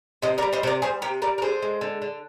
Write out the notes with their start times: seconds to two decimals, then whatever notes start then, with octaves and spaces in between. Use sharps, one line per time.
0.22 C3 C5 D#5
0.38 A#4 D5
0.42 G3
0.53 C5 D#5
0.63 C3 C5
0.67 A#4 D5
0.82 G3 G#4 C5
1.02 C3 G4 A#4
1.22 G3 A#4 D5
1.38 A#4
1.42 D3 G#4 C5
1.62 G#3
1.81 D3
2.02 D3